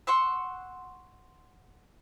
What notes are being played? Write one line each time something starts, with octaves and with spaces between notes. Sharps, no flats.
F#5 C6 C#6 E6